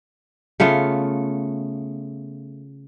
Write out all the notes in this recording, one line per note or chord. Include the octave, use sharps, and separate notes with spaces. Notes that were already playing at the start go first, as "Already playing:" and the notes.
C#3 A3 B3 F4